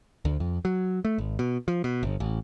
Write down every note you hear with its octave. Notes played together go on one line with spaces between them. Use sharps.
D2
F2
F#3
A3
G#1
B2
F3
B2
G1
A1